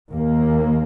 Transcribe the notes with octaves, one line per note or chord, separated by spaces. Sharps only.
D#2 A#3